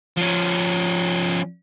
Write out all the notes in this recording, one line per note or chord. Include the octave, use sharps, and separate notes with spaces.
F3 C#4